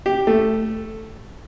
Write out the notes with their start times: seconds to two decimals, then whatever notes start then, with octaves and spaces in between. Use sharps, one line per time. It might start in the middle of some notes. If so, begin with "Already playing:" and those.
0.06 G4
0.27 A3